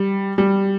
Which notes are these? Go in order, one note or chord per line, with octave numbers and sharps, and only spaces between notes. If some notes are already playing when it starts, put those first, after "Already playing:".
Already playing: G3
G3